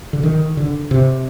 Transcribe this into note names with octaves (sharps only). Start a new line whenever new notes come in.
D3
D#3
D3
C3